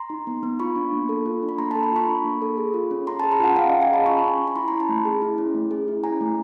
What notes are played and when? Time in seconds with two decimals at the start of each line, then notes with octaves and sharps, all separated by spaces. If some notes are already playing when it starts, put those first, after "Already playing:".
Already playing: A#5 C6
0.10 D#4
0.27 B3
0.43 B3
0.60 F4 B5 C#6
0.76 D4
0.93 A#3
1.09 A4
1.26 F4
1.42 D4
1.49 B5
1.58 A#3 A#5 C6
1.71 A4 A5 B5
1.83 A#5 C6
1.92 F4 B5 C#6
2.08 D4
2.25 A#3
2.42 A4
2.57 G#4
2.74 F4
2.91 C#4
3.07 C#4 A#5 C6
3.19 G#4 A5 B5
3.31 A#5 C6
3.40 F4 F#5 G#5
3.56 C#4 F5 G5
3.69 C#4 D#5 F5
3.82 G#5 A#5
3.90 G#4 A5 B5
4.06 F4 B5 C#6
4.23 C#4
4.39 C#4
4.47 B5
4.56 E4 A#5 C6
4.68 C#4 A#5 C6
4.80 A5 B5
4.89 A3
5.05 G#4
5.22 E4
5.38 C#4
5.55 A3
5.71 G#4
5.88 E4
6.04 C#4 G#5 A#5
6.21 A3